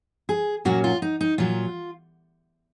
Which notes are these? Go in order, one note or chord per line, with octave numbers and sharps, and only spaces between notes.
G#4
A#2 F#3 A#3 C#4 F#4
F4
D#4
D#4
A#2 F#3 F4